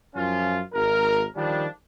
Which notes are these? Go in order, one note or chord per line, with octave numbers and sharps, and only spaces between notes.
F#2 F3 C#4 F4
G#1 A#4
D#3 F3 G3 D4